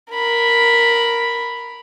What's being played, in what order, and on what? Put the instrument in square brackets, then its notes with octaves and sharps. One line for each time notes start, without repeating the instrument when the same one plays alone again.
[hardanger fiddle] A#4 B5